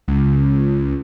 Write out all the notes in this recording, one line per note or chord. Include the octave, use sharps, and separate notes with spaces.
C#2